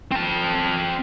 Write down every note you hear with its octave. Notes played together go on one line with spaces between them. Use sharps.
C4 A5